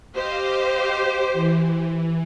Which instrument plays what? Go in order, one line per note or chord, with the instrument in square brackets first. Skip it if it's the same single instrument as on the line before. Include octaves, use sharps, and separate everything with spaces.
[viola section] G4 C5 [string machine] D#5 F5
[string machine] E3